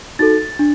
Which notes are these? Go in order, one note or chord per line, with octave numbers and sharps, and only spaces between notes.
D#4 F#4 A4 A6
D4